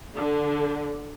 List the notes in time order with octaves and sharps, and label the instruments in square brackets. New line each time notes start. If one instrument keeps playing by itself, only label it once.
[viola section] D3